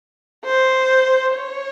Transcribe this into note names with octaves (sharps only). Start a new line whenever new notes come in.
C5
C#5